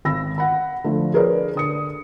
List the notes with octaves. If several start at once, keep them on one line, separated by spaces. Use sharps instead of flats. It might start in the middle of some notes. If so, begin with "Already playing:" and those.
G#1 B5 E6 A#6
F#5 B5
D3 F3 A3
G#4 A#4 B4 C#5 D5
D3 D#6 C#7